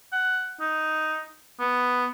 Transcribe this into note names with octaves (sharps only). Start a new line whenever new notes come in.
F#5
D#4
B3